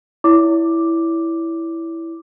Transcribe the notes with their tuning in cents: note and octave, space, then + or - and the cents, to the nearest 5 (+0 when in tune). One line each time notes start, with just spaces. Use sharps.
E4 +0 C#5 +40 D6 +0